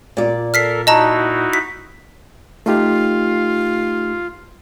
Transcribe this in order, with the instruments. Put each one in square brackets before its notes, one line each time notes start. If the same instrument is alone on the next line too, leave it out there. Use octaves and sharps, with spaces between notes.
[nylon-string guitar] A#2 D5
[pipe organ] A4 A#4 [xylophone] F6 B6 C7
[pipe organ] D#4 E4 F#4 [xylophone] D#5 A5 A#5
[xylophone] B6
[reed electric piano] A3 D#4 G4 [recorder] F4